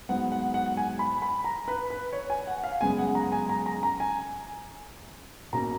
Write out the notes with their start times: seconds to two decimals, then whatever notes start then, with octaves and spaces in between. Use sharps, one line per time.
0.09 G#2 F#3 B3 F#5
0.32 F#5
0.54 F#5
0.77 G#5
0.99 B5
1.22 B5
1.44 A#5
1.68 B4
1.90 B4
2.13 C#5
2.30 G#5
2.47 F#5
2.64 F5
2.81 F#2 C#3 G#3 B3 G#5
2.98 F#5
3.15 A#5
3.32 G#5
3.49 A#5
3.66 A#5
3.83 A#5
4.00 G#5
5.53 B2 A#3 C#4 A#5